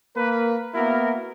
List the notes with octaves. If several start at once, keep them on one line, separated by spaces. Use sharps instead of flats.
A#3 A#4 B4
A#3 B3 E4 F#4 A#4